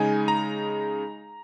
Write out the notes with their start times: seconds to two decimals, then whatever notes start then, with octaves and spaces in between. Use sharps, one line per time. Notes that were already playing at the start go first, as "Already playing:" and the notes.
Already playing: C#3 G#3 D#4 G#5
0.28 A#5